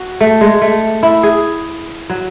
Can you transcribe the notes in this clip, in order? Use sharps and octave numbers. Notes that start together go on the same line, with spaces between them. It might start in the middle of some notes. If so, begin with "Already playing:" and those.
Already playing: F#4
A3
G#3
A3
E4
G#4
F#3